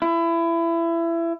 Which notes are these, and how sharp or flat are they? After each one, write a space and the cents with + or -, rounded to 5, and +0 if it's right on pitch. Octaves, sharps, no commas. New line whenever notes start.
E4 +25